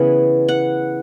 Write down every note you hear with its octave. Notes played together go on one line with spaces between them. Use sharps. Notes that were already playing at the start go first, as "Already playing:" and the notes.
Already playing: C#3 E3 B3 G#5
F#5